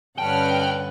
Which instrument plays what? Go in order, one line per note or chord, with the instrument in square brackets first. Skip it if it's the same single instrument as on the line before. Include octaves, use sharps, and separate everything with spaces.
[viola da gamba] G2 D3 B4 [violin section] C#4 F#5 F6 [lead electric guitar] G5 [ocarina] A5